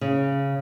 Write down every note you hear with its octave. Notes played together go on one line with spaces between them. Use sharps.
C#3